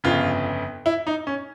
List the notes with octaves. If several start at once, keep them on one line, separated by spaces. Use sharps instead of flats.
G1 F2 C#3 F4
E4
D#4
C#4